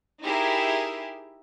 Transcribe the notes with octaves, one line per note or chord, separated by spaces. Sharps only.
D#4 E4 G4 G#4 A#4 E5